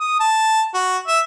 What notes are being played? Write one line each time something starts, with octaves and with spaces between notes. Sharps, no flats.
D#6
A5
F#4
E5